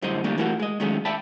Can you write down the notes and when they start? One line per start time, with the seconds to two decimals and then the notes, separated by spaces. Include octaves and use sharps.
0.02 F#2 A2 D3 G3 C5 D#5
0.24 D3 G3 A3 A#3 D4 D#4
0.38 E3 G3 A3 A#3 D4 F#4
0.59 G#3 D#5
0.80 D#3 F#3 G#3 A3 C#4
1.05 D5 E5 G5 A5 B5